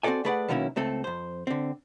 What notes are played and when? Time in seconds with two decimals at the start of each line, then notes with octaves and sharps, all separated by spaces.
0.03 C4 F#4 G4 A4 D5 G#5
0.25 A3 G#4 B4 D5 F#5
0.48 B2 D#3 F#3 A#3 C#4 E4
0.76 C#2 A3 C4 A4
1.04 F2 C5
1.47 D3 C4